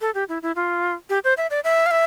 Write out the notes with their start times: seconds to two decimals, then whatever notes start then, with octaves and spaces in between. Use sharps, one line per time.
0.01 A4
0.15 G4
0.29 E4
0.42 E4
0.56 F4
1.10 G4
1.24 C5
1.37 E5
1.51 D5
1.64 E5
1.86 F5
1.91 E5